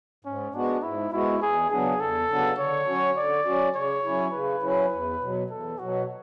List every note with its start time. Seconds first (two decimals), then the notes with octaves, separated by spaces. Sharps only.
0.25 G#2 C#4
0.54 G#3 B3 D4 F#4
0.83 G#2 E4
1.12 G#3 B3 E4 F#4
1.42 E2 G#4
1.70 C#3 F#3 B3 D4 G#4
2.00 E2 A4
2.30 C#3 F#3 B3 D4
2.58 D3 C#5
2.87 F#3 C#4 F#4
3.17 D3 D5
3.45 F#3 C#4 F#4
3.75 C#3 C#5
4.04 F#3 C#4 E4
4.33 C#3 B4
4.63 F#3 C#4 E4
4.92 E2
5.20 B2 F#3
5.50 E2 A4
5.79 B2 F#3 F#4